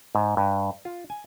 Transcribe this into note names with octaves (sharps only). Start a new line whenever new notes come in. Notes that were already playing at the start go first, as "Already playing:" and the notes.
G#2
G2
F4
G#5